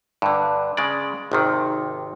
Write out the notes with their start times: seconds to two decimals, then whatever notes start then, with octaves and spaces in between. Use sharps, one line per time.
0.22 G2 D3
0.77 C#3 G#3 D5
1.32 G#1 C3 D#3